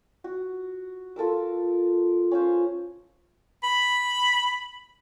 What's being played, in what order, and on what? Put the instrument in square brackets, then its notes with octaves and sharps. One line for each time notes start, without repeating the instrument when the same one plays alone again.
[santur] F#4
F4 A4 A#4 E6
C#4 F4 C5
[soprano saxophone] B5